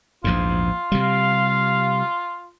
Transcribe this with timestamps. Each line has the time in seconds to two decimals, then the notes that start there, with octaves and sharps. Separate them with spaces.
0.24 A#1 E2 G#2 F4
0.92 C3 G3 F5